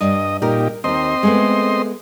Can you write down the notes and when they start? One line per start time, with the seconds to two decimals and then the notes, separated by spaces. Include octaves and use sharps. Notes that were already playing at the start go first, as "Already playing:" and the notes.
0.01 G2 D#5
0.42 A#2 D#4 G4 A#4
0.84 D#2 C4 D#4 D#5 C6
1.23 G#3 A3 B3